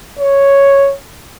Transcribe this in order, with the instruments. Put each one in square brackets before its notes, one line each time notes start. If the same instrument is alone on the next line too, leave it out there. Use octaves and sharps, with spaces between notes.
[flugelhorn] C#5